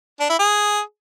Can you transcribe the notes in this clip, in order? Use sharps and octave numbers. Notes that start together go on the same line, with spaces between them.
D4
E4
G#4